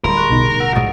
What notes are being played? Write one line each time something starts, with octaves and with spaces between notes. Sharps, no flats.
D1 G3 A#4 B5 C6
G#4 C#6 F#6
B1 B2 D#4
F#5 E6
A#1 G#2 B2 C#6 D#6 A6 D7